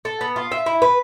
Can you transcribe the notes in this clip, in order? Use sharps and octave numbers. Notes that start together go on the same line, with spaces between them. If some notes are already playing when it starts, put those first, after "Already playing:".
A4
B3
F4
E5
E4
B4